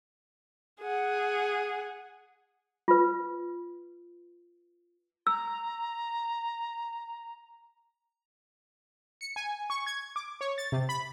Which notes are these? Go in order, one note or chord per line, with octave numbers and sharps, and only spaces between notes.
G#4 F#5
F4 B4
A#5 E6
C#7
G#5
C#6
G#6
D6
C#5
A6
C3
B5